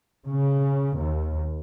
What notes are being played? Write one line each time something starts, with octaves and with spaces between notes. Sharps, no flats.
C#3
D#2